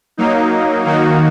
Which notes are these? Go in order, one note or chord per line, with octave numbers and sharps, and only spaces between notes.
F#3 A#3 D#4
D#3 A#3 D#4 F#4